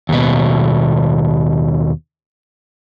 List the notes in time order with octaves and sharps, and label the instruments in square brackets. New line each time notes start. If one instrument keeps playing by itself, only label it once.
[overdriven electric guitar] D#2 B2